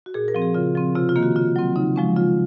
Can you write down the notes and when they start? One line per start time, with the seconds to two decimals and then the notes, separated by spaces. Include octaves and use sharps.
0.06 F#4
0.14 A#2 G#4
0.28 A#4
0.35 F3 C4
0.42 G#4
0.54 C#3 F4
0.75 F3 C4
0.95 C3 F4
1.09 F4
1.16 D#3 A#3
1.23 F#4
1.36 C#3 F4
1.56 F#3 C4
1.76 C#3 D#4
1.96 F3 G#3 C#4
2.16 C#3 F4